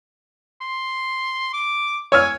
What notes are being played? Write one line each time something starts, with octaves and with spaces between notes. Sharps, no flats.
C6
D6
C#5 G#5 E6 F6